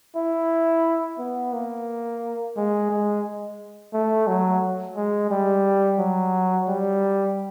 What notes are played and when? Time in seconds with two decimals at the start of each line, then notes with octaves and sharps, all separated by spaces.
0.16 E4
1.19 B3
1.53 A#3
2.57 G#3
2.90 G#3
3.93 A3
4.27 F#3
4.96 G#3
5.31 G3
5.99 F#3
6.68 G3